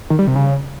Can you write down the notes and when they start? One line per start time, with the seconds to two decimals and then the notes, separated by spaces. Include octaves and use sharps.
0.10 D#3
0.19 G3
0.27 C3
0.36 C#3